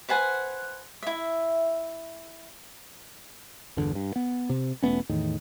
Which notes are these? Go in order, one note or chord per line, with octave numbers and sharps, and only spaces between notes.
B4 C5 F#5 G#5
E4 E5
G1 E2 D3
G2
B3
C3
E1 A3 B3 C#4
E2 A2 D#3